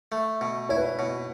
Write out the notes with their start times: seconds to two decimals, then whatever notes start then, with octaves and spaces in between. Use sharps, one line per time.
0.12 A3
0.41 B2
0.69 E4 C#5
0.77 B4
0.84 C#5
0.99 B2